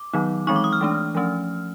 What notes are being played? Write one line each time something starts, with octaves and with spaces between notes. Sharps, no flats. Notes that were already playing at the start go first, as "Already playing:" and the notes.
Already playing: D6
D#3 F#3 B3 D#4
E3 G#3 C4 D#4 C#6
D6
D#6
F6
E3 A3 D4
F3 A3 C#4